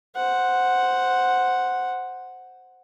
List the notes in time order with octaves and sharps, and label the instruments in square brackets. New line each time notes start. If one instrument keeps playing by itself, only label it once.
[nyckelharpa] C5 F#5